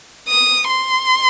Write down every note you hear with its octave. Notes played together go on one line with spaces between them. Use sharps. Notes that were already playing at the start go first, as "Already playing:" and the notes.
D#6
C6